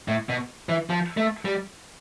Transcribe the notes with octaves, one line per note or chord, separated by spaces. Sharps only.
A2
B2
E3
F3
A3
G3